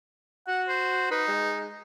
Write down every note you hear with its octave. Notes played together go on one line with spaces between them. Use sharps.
F#4 F#5
C5
D#4 B4
G#3